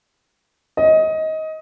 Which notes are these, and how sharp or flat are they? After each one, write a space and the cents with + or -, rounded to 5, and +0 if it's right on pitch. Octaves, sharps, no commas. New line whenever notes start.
D#5 +20